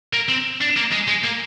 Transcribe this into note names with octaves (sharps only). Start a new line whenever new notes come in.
A#3
C4
D4
A#3
G#3
G#3
A#3